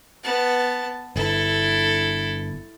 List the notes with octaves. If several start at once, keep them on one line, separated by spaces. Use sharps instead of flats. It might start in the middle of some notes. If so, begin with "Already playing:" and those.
B3 A5
G1 E4 A4